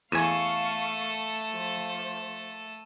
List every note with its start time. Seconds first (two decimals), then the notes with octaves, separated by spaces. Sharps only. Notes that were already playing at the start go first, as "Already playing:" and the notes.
0.12 E2 A3 A4 F5 G#5 C#6 D#7 E7
1.51 F3